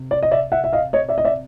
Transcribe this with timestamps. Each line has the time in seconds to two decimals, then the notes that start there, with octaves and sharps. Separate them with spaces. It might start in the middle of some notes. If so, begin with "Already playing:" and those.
Already playing: C3
0.11 D5
0.23 D#5
0.31 D5 E5
0.52 E5 F#5
0.64 E5
0.73 D#5 F5
0.93 C#5 D#5
1.09 D5 E5
1.18 D#5
1.25 D5 E5